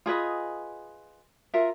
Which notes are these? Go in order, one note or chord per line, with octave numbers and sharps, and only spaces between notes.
F4 G#4 B4 D#5
F4 A#4 E5